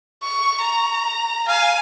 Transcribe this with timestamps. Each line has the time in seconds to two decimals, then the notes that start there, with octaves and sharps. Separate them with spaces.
0.23 C#6
0.61 A#5
1.48 F5 G#5